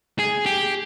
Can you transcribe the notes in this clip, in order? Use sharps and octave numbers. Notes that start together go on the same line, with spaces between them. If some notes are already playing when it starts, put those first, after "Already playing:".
G#4
G4